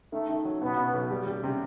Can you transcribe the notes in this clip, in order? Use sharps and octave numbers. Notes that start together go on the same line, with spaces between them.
D#3 A3
D#3
F#3
B2 B3
B2
B1
G3
G3
C3